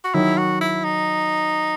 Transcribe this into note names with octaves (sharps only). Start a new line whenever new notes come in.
F#4
D#3 F#3 E4
F#4
E4
D#4